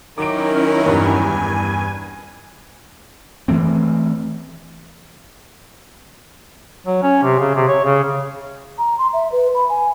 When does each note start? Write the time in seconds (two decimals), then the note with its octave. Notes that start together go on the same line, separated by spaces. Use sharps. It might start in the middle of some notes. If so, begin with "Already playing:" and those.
0.18 D#3 F#3 C#4 E4 A#4 D6 D7
0.86 E2 G2 G#5
3.48 E3 F3 A3 C4
6.87 F#3
7.03 C#4
7.23 C3
7.39 C#3
7.55 C3
7.68 C#5
7.84 C#3
8.78 A#5
8.98 C6
9.13 E5
9.32 B4
9.55 B5
9.69 G#5